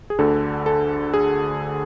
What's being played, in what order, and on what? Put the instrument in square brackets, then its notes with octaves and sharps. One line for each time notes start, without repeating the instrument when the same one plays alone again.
[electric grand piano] G#4
D2 D3 A4
A4
G#4